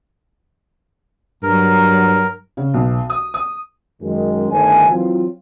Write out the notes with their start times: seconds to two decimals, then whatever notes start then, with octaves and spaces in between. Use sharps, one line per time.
1.43 G2 F#3 A#4
2.57 C#3
2.74 B1
3.10 D#6
3.34 D#6
4.01 F#2 D#3 G#3
4.51 G1 D#3 A3 G#5
4.90 E3 F#3 C4 F4